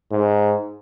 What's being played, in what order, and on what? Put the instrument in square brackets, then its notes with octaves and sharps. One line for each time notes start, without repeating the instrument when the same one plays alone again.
[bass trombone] G#2